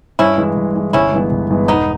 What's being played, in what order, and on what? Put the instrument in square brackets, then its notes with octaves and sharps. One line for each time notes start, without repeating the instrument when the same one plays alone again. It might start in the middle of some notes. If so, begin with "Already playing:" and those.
[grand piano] G2 [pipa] C#4 E4
[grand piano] E3 G#3
G2
E3 G#3
[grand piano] G1 [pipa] C#4 E4
[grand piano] G2 E3 G#3 B3
G1
G2 E3 G#3 B3
[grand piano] E1 [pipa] B3 D#4